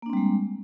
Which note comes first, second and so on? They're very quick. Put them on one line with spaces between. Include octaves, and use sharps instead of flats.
A#3 D4 C4 G3 G#3